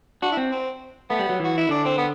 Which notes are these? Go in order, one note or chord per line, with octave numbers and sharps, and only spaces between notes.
D4 F#4
E4
C4
C4
A3 B3
G3
F#3
E3 F#4
E4
D3 D4
C4
B3